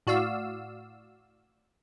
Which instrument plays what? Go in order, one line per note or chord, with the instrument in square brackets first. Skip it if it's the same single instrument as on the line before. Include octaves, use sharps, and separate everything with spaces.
[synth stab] A2 F#4 D5 F5 E6